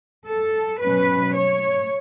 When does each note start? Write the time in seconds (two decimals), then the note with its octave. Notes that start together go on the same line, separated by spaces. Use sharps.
0.25 A4
0.80 B2 F#3 C#4 B4
1.35 C#5